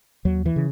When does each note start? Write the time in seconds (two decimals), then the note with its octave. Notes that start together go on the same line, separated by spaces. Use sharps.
0.25 D#2 F#3
0.46 E3
0.56 C#3